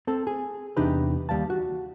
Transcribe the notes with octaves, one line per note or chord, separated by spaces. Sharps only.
C4 A4
G#4
E2 C3 D4 D#4 G4 B4
D#2 G3 F5 A5
F#4